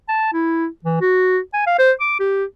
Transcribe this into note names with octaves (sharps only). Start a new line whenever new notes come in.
A5
E4
E3
F#4
G#5
F5
C5
D6
G4